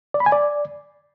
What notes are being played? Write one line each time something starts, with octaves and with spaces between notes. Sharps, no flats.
D5
B5
G#5
D5